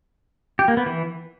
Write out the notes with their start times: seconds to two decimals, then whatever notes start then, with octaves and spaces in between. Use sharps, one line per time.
0.59 G4
0.68 A#3
0.77 B3
0.86 E3